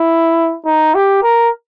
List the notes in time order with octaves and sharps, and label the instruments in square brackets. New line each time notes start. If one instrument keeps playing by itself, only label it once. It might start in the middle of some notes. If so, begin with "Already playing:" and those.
Already playing: [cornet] E4
D#4
G4
A#4